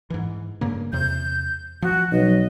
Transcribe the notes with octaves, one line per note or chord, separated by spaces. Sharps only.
G#2 E3
G2 C#3 A#3
E2 C3 G6
F3 F#4
B1 D#5